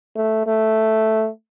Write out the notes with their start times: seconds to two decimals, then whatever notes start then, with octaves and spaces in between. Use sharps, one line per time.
0.16 A3
0.47 A3